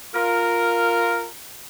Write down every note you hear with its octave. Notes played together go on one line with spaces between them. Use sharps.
F4 A#4